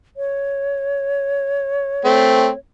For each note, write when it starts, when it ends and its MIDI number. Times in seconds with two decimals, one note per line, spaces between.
0.17 2.59 73
2.05 2.49 57
2.05 2.49 60